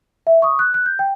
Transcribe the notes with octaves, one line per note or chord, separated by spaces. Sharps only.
E5
C#6 D#6
F#6
F#6
G6
G5